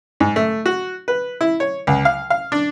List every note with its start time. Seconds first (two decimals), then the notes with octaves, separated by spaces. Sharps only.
0.20 G#2
0.36 A3
0.66 F#4
1.08 B4
1.41 E4
1.60 C#5
1.87 C#2
2.05 F5
2.30 F5
2.52 D4